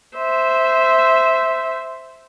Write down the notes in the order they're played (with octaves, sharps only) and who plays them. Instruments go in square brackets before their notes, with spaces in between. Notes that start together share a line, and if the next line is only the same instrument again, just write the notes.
[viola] C5 E5